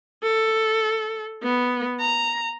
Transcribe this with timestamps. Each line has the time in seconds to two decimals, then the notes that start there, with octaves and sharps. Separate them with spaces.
0.23 A4
1.43 B3
2.00 A#5